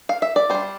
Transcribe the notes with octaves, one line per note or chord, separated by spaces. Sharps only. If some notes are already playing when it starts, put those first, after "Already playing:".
F5
E5
D5
G3 D4 C5